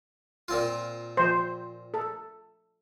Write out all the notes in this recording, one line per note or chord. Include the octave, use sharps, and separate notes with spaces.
A#2 C4 F4
F3 C5
A4